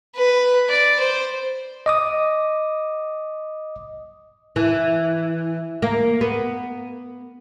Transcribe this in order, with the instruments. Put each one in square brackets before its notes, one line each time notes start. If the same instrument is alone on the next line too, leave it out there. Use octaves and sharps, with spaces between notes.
[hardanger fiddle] B4
D5
C5
[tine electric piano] D#5 D6 D#6
[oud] E3
A#3
B3